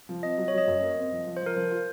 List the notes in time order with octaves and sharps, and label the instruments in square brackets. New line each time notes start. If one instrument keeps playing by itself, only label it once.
[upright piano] F3
[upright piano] C4 [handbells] D#5
[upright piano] F#3
[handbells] C#5
[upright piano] F#3 [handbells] D#5
[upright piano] F#2
A#3
C4
F3
F3
[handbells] C5
[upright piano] F3
[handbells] A#4
[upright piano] F3 [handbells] C5
[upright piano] F4